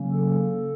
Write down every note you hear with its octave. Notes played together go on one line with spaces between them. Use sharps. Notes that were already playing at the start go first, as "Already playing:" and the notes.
Already playing: C#3 F#3 A#3 C#4
A4